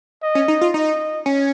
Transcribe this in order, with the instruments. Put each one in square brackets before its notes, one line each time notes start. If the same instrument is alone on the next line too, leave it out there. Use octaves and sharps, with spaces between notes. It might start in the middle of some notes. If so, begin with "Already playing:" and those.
[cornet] D#5
[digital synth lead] C#4
D#4
F4
[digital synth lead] D#4 [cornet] D#5
[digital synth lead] C#4